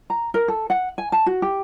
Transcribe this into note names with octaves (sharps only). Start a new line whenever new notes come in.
A#5
A#4
A4
F#5
G#5
A5
F#4
G4